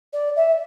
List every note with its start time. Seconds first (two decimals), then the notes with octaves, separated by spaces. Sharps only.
0.13 D5
0.36 E5